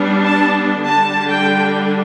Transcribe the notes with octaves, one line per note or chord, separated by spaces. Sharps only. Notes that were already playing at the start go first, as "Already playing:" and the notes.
Already playing: G3 B3 D4
A5
D3 G3 D4 A5
G5